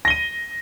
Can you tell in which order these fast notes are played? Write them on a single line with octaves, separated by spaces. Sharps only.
A#6 G7 D#7